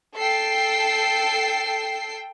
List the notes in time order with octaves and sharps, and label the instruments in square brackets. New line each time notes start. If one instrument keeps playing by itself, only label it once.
[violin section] A4 G5 C7